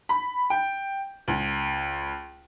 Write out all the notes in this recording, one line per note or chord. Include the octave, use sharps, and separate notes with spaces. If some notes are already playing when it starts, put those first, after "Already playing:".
B5
G5
C#2